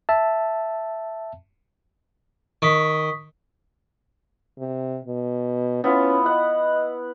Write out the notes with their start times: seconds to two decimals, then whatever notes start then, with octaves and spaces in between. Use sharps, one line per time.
0.09 E5 A5
2.62 D#3 C#6 D#6 B6
4.59 C3
5.04 B2
5.84 B3 C#4 E4 F4
6.26 D#5 F#5